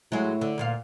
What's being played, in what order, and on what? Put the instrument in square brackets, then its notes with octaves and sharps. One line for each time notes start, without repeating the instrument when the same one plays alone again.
[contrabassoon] A2 [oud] F#3 G#3
[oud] D3
D2 A#2 F5